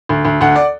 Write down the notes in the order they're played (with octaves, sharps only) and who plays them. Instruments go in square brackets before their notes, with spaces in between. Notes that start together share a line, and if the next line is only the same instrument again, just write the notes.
[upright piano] D2
D2
D2 F#5
D5